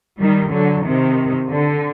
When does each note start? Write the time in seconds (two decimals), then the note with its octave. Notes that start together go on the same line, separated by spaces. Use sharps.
0.18 D#3 G3
0.50 D3 F#3
0.83 C3 D#3
1.49 D3